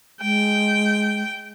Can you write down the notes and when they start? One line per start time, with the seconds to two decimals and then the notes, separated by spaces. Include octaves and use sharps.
0.22 G#3 G5